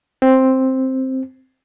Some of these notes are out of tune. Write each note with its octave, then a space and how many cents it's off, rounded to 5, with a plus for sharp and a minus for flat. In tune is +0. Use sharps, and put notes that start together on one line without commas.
C4 +5